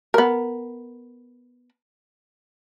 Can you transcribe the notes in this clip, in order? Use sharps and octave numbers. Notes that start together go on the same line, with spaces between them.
B3 A#4